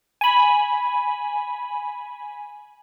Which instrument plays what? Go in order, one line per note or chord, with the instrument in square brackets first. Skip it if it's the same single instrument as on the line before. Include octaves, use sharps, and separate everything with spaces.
[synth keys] G#5 B5